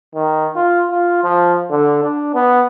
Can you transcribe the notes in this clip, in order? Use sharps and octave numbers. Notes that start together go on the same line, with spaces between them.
D#3
F4
F4
F3
D3
D4
B3